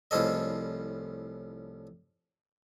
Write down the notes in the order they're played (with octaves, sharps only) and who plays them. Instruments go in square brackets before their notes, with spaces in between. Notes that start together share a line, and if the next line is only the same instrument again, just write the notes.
[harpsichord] C2 A2 F3 C#4 A4 D#5